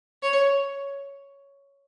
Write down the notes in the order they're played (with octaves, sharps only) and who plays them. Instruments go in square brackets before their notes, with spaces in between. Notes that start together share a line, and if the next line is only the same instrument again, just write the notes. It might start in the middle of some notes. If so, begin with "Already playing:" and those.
[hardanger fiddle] C#5